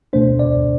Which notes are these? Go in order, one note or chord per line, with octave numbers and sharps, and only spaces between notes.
B2 A3 D4 C5
D5